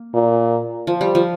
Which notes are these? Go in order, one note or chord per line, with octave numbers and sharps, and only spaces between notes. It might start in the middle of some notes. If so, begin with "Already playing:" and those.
Already playing: A#3
A#2
F3
G3
F3